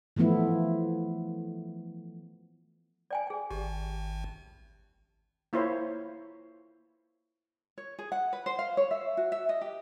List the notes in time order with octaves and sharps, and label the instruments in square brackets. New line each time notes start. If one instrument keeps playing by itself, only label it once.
[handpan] E3 F3 A3 B3 E4
[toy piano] D5 G5 G#5
G#4 G5
[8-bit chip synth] G#1 [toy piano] G4
[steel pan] A#3 E4 F4 C5 C#5
[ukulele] C#5
G#4
F#5
B4
C5
F5
C#5
E5
F#4
E5
D#5
G4